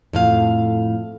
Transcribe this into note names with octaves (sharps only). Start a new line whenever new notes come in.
F2 A2 F5